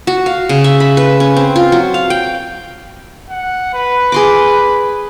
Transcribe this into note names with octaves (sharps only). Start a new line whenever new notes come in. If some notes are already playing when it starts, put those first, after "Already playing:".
F#4
F5
C#3
E5
B5
B4
C#4
C4
F4
F#3
F5
G5
F#5
B4
G#4 C6 D6